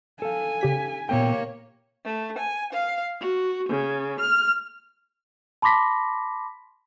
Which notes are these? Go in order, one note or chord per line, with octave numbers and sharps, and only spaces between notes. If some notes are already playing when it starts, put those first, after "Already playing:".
A4 F5 G#5
C#3 G4 B6
A#2 A#3 B3 C#5 G5
A3
G#5
F5
F#4
C#3
F6
A5 B5 C6 D6 A#6 B6